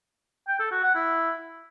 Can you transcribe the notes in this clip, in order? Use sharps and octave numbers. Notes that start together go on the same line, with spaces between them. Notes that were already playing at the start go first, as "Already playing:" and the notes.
G5
A4
F#4
F#5
E4